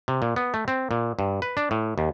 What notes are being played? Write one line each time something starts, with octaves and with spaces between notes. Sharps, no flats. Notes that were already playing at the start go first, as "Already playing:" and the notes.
C3
A#2
B3
A3
C4
A#2
G2
B4
D4
A2
D#2